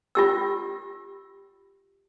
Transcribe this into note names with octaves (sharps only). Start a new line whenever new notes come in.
F4 G4 E6